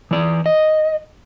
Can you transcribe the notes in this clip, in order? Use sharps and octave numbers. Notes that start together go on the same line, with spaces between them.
E3 D5
D#5